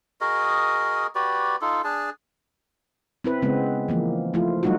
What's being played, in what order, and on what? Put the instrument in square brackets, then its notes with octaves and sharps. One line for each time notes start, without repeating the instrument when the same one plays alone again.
[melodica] F#4 G#4 A#4 D#5
F#4 G4 B4 D5
D#4 F4 A4
D4 G#4 A5
[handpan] C4 E4 B4
C#3 G#3 B3 C4
E3 F3 A#3
F3 A3 E4 F4
F#3 G3 A3 D#4 F4 F#4